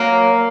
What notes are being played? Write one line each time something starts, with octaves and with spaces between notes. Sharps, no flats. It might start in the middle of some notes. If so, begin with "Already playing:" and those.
Already playing: F#3 A#3